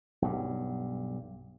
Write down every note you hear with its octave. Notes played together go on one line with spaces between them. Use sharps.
B1 G2